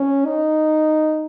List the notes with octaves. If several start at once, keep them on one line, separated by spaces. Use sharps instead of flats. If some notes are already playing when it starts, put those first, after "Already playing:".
Already playing: C#4
D#4